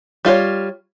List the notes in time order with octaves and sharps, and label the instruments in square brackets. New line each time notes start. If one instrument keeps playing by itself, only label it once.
[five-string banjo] G3 F4 F#4 C#5